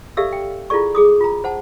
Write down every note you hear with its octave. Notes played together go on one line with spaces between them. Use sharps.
G4 A4 D5 E5 F5 E6
G5
E4 F4 G#4 A4 D5 C#6
G#4 D6 D#6
F4 A#5
C5 F#5 A5